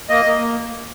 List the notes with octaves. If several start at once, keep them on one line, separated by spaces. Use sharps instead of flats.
A#3 D#5
A#3